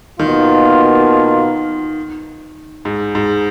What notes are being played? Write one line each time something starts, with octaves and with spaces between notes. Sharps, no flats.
B2 D#3 A#3 F4
G#2
G#2